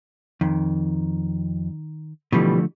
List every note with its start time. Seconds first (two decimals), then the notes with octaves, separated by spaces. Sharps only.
0.41 F2 D#3
2.32 B2 D3 E3 F3 G3 A3